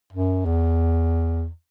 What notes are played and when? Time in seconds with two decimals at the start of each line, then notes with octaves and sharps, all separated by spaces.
0.13 F#2
0.46 E2